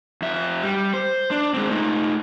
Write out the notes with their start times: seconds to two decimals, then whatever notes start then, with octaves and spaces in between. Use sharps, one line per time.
0.22 F2 E5
0.63 G3
0.94 C5
1.31 D4
1.54 G#3 C4
1.70 A3 D#4